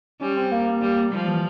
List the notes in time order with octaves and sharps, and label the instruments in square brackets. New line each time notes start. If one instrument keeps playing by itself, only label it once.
[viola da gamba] G3 [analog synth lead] C#4
[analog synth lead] C4
A#3
[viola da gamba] G3
[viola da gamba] F3 [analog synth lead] G3
[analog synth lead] E3